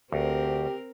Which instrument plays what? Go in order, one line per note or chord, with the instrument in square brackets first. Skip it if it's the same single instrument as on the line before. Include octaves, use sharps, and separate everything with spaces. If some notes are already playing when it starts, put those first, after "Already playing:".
[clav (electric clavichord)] D2 [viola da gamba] C4 A#4 [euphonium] G4